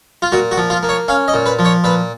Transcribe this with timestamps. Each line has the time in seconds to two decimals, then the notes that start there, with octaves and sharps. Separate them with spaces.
0.22 F4
0.32 A#2 F#4
0.51 F#4
0.58 F3
0.70 F4
0.83 A#3
0.89 C#5
1.08 C#4 F5
1.28 D#5
1.34 A#2
1.46 B4
1.59 F3
1.65 C#5
1.84 A#2 B4